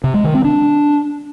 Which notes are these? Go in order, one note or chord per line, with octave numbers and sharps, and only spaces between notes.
C3
G#3
D#3
C4
D4